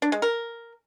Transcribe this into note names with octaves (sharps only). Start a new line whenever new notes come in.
D4
G#3
A#4